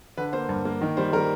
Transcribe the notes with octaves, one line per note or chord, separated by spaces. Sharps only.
D3 B4
A#3 C5
G2
A#3
D#3
G3 C5
G3 A#4